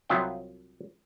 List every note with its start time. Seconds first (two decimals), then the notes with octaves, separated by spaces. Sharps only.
0.09 C2 F#3 E4 F4 D#5 G5